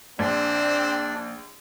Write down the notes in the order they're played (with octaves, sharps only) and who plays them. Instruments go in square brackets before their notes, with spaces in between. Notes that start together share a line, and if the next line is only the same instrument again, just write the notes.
[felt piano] A#1 [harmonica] C4 [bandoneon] D4 D5